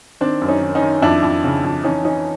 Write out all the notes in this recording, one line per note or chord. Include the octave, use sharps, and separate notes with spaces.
D#3 C4 D4
F#2
C#4 D#4
D#3
C#4 D#4
D#3
F2 D4 E4
F2
C#3
F2
E3 C#4 D#4
E3 C#4 D#4